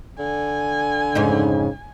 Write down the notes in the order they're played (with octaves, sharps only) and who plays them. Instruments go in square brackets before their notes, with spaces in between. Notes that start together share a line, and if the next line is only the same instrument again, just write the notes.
[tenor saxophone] D3 [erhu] G#5
[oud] F2 G#2 D#4 [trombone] C#3